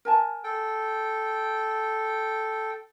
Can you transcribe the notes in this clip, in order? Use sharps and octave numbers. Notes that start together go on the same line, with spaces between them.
A#4 G#5 A5
A4 G5